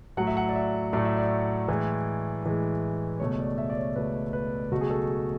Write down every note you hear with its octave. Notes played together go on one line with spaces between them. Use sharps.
A2 F#3 A3 F#5
E5
F#5
D5
E5
A2 F#3 A3 D5
E5
D5
A2 E3 G#3
A2 E3 G#3
C#2 B2 A3 C#5
D5
E5
D5
C#5
C#2 B2 A3 B4
B4
C#2 B2 F#3 A3 F#4
G#4
A4
G#4